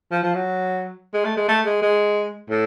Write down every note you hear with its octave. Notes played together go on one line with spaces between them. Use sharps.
F3
F3
F#3
G#3
A3
G#3
A3
G#3
G#3
A2